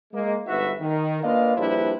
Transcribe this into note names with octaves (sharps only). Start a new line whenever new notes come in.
G#3 A#3 D#5
G1 G#2 F#4 B4 E5
D#3
A#3 D4 F4 B4 D#5 F5
A#1 G3 D4 E4 B4 C5